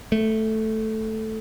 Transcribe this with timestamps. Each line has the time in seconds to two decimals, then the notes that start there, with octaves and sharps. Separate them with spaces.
0.12 A3